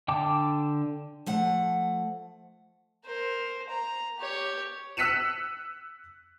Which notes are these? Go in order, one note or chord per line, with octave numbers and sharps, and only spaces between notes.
D3 G5 A5 D6
F3 A3 F#5
A#4 C5
A#5
G4 C#5
E6 F#6 B6 C#7 D#7 E7